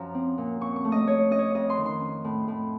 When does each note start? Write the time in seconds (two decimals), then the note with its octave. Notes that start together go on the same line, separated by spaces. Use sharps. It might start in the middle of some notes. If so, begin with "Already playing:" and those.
Already playing: F#2 F3 A#5
0.14 C4
0.38 A#2
0.61 A#2 C#6
0.76 C#6
0.84 A3
0.92 D#5
1.07 A3 C#5
1.30 C#4 D#5
1.39 C#5
1.54 F2 D#5
1.70 C6
1.78 D#3
1.86 C6
2.01 C#4
2.24 A2
2.48 A2